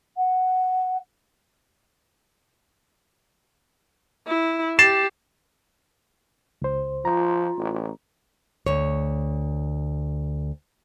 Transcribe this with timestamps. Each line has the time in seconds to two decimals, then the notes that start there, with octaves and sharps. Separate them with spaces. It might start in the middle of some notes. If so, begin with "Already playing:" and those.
0.17 F#5
4.27 E4
4.79 G4 A6 C7 E7
6.62 C#2 C5
7.05 F3 F4 A#5
7.57 A1
8.66 D2 C#5